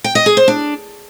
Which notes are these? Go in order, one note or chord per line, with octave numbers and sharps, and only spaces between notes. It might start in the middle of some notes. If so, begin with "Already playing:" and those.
G5
D#5
G#4
C5
D4